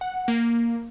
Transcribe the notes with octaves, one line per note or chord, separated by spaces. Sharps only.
F#5
A#3